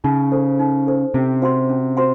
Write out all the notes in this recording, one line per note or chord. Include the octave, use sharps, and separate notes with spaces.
C#3 D#4
A4 C5
D#4
A4 C5
C3 C#4
F#4 C5 F#5 C6
C#4
F#4 C5 F#5 C6